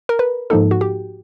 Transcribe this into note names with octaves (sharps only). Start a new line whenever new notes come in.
A#4
B4
G#2 F3 A#3 D#4 A4
F#4
G4